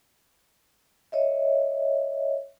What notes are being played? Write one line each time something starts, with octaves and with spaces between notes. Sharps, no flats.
C#5 D#5 E5